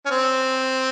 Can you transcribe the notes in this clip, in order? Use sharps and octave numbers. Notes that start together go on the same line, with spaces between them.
C#4
C4